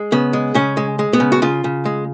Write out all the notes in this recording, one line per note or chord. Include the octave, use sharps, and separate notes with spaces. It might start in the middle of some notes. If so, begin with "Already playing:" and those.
Already playing: G#3
C#3 B3
G#3
C#3 C#4
G#3
G#3
B3
C#3
F#4
C#3 F4
C#3
G#3